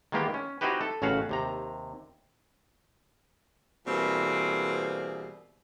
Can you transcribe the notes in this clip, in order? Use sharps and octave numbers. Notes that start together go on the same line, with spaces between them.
D#3 E3 G#3 A#3 B3 G4
C#4
C4 D#4 E4 F#4 G4 B4
A4
A1 C#3 C#4 F#4 F5 F#5
D#2 C3 A#5
B2 E3 G3 A#3 C4 G#4